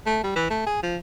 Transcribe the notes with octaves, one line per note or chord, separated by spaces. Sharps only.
A3
G3
E3
A3
G#4
F3